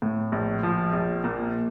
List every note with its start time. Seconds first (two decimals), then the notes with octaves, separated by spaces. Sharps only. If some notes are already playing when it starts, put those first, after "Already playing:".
0.02 A2
0.32 A#1
0.63 F3
0.93 A#1
1.24 A#2